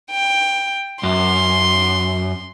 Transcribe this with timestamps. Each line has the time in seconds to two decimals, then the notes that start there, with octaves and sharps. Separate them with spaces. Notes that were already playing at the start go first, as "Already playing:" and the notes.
0.12 G5
1.03 F#2 C6